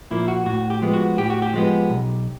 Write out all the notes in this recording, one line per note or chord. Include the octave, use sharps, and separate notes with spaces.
A#2 F3 A#3 E4
F#4
A2 F#4
G4
F3 G#3 B3
F#4
A2 G4
F#4
G4
F3 G#3 B3
B1